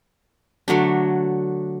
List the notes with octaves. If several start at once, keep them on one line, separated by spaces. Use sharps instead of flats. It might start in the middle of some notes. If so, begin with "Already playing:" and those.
D3 F#3 A3 D4